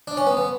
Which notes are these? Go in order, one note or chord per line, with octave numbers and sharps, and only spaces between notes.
D4
C#4
B3
B3